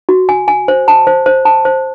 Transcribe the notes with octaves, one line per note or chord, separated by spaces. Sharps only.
F#4
G#5
G#5
C5
A5
C5
C5
A5
C5